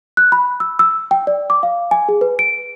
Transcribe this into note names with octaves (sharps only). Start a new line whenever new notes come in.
F#6
B5
E6
E6
G5
D5
D6
F5
G#5
G#4
B4
D7